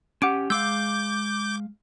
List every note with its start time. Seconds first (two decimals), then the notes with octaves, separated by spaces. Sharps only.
0.22 C#4 G4 F#5 D6 D7
0.50 G#3 F5 D6 E6 G6